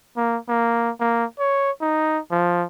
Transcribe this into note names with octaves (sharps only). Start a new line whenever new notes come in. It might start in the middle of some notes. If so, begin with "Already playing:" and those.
A#3
A#3
A#3
C#5
D#4
F3